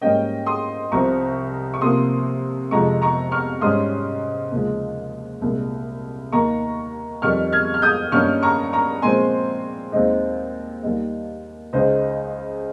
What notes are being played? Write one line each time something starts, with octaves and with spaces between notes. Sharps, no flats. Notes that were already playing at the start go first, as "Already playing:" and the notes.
G#2 G3 A#3 C#4 D#5 G5
C6 D#6
C2 C3 F3 C4 A#5 C#6
C#6
C3 F3 A#3 C6 D#6
F2 C3 F3 G#3 A#5 C#6
A#5 C#6
C#6 F6
G#2 G3 C#4 C6 D#6
D#2 C#3 F3 G#3
C2 A#2 G#3
D#2 D#3 A#3 A#5 C#6
F2 D#3 G3 C#6 F6
F6 G#6
F6
D#6 G6
G2 D#3 A#3 C#4 C#6 F6
A#5 C#6
A#5 C#6
A#2 F3 G#3 C4 G#5 C6
D#2 D#3 G#3 C4 D#4
D#2 D#3 G3 A#3 D#4
C#2 C#3 G#3 D#4 C5 D#5